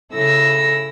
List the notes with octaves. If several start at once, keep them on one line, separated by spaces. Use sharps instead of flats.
C#3 E4 A4 E6 A#6